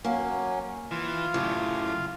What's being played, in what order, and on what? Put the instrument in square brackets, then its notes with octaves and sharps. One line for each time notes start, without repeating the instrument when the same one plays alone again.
[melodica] F#3 C#4 [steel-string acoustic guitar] A#3
[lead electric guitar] E3 [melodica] F4 F5
[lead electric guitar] F#2 C#3 [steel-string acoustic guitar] A2 G4